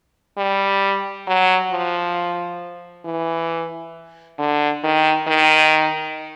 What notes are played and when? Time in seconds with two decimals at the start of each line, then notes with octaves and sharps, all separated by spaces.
0.38 G3
1.27 F#3
1.71 F3
3.05 E3
4.39 D3
4.83 D#3
5.27 D#3